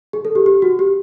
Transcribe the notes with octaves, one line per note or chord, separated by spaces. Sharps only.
G#4
A4
G4
G4
F#4
G4